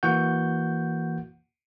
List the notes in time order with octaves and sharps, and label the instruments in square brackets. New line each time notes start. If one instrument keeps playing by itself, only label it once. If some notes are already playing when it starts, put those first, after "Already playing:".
[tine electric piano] E3 A#3 E4 F#4 F#5 G6